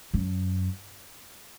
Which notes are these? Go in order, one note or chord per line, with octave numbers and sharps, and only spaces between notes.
F#2